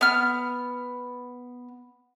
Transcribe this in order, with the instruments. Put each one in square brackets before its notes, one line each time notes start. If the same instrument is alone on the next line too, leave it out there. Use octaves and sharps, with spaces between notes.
[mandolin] B3 F6